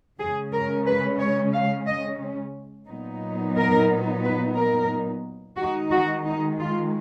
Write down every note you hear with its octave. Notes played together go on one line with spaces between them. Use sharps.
C#3 G#3 C#4 G#4
A#4
B4
C#5
F5
D#5
A#2 F#3 B3 D#4
A#4
B4
A#4
D#3 G#3 D#4 F#4
F#4
D#4
F4